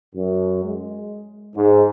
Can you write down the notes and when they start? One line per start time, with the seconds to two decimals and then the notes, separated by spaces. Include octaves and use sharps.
0.14 F#2
0.63 G#3
1.55 G#2